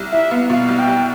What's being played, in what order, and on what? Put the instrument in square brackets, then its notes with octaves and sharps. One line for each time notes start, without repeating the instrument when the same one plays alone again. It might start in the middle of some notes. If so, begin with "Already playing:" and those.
Already playing: [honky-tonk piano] C2
[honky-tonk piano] E4 [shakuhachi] E5
[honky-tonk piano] B3 [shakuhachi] F5
[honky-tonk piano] B2 [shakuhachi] F5
[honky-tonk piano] C2
[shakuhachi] G5
[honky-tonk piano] C2